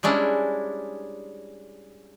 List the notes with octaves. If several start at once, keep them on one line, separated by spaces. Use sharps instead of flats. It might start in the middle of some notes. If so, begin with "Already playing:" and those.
G3 G#3 C#4 D4 E4